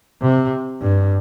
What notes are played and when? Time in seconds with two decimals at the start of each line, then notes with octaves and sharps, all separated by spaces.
0.22 C3
0.81 G2